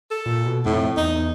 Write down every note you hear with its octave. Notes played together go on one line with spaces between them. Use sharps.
A4
A#2
B2
F2 A2
E2 D#4